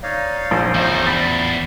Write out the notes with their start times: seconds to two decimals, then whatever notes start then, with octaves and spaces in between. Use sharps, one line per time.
0.03 D#4 C#5 D5 F5
0.51 A#1 C5
0.75 E2 A3 D#4 C5 D#5
1.06 D5 B5 A6